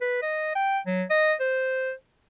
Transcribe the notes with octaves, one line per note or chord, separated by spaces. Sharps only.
B4
D#5
G5
F#3
D#5
C5